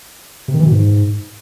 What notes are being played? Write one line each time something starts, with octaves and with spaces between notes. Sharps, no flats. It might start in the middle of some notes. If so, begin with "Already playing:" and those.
C3
D#3
E3
B2
G#2